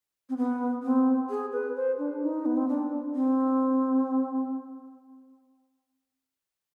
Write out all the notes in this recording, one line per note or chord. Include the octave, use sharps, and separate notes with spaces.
C4
B3
C4
G#4
B4
C5
D4
D#4
B3
C4
D4
C4